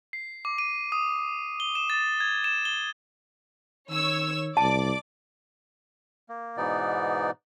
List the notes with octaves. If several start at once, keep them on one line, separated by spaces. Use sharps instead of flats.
C7
D6
D#7
D#6
G7
E7
A6
G#6
E7
G7
D#3 C#5 E6
C2 D5 A5 D6
A#3
G#2 B2 E3 B3 D#4 D5